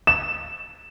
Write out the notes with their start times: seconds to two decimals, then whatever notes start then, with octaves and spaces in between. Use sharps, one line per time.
0.07 E7